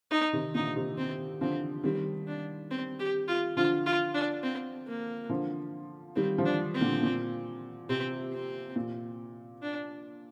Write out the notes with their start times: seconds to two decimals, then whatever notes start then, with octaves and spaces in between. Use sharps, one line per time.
0.11 D#4
0.33 C3 D#3
0.54 A#2 D3 D#4
0.76 C3 D#3
0.98 C4
1.41 D3 F3 C4
1.84 D#3 G3 C4
2.28 D4
2.71 C4
3.00 G4
3.28 F4
3.57 D3 F3 F4
3.86 F4
4.14 D4
4.44 C4
4.87 A#3
5.29 D3 F3
6.16 D#3 G3 C4
6.38 D3 F3
6.45 D4
6.74 C4
6.81 A#2 D3
7.03 A#2
7.89 C3 C4
8.33 C4
8.76 A#2
9.63 D4